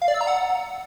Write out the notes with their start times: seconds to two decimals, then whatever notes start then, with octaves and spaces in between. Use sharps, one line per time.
0.02 F5
0.08 D5
0.14 E6
0.21 A#5
0.27 F#5